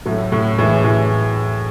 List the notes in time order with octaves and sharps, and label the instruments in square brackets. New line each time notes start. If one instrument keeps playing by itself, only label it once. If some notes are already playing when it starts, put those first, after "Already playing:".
[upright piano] A2 [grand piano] F#3 A3
[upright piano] A2
[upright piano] A2 [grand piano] E3 G#3
[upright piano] A2